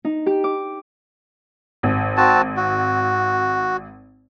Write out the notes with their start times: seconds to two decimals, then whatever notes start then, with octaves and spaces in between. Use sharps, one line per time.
0.05 D#4
0.26 G4
0.44 D6
1.83 G#1
2.17 C4 F#4 A5
2.57 F#4